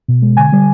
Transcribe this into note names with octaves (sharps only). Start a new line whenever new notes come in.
B2
G#3
D3 G#5
G3